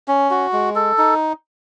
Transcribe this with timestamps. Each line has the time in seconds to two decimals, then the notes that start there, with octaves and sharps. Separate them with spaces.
0.08 C#4
0.31 F#4
0.53 G#3
0.75 A4
0.98 D#4